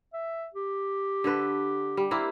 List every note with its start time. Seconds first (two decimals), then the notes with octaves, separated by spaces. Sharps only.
0.13 E5
0.54 G4
1.24 D3 A4 B4
1.97 G3
2.11 A#3 C4 E4